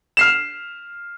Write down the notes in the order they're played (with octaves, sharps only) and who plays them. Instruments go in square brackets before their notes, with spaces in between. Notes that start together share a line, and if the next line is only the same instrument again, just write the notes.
[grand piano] F6 C7 E7